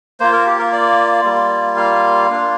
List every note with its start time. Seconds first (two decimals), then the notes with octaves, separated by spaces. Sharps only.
0.20 A#3 F4 C5
0.33 A#4
0.46 G4
0.59 A#4
0.73 D5
1.24 G3 A#3 F4
1.77 F5
2.29 A#3 D4 F4